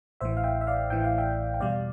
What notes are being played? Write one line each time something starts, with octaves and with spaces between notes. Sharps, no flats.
A1 A2 E3 C5 E5
F5
E5 G5
E5
D5 F5
A1 A2 E3 G5
F5
E5 G5
G5
E2 B2 G3 D5 F5